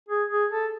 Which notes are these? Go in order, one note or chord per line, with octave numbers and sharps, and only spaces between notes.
G#4
G#4
A4